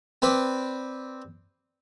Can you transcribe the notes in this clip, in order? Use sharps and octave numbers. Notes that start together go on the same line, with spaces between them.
C4 B4 D5